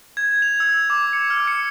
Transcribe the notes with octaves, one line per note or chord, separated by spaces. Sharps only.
G#6
F7
E6
D6
C#7
F6
C#7